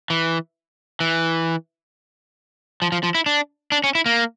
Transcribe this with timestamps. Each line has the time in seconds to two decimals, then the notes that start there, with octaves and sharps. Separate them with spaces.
0.10 E3
1.00 E3
2.82 F3
2.92 F3
3.04 F3
3.15 E4
3.26 D4
3.72 D4
3.84 C#4
3.95 E4
4.06 A#3